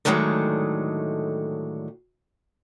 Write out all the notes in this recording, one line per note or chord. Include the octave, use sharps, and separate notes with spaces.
A2 D3 D#3 F#3 G#3 A3